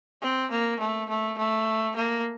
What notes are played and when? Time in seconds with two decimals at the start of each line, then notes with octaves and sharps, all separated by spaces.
0.22 C4
0.51 A#3
0.80 A3
1.09 A3
1.38 A3
1.96 A#3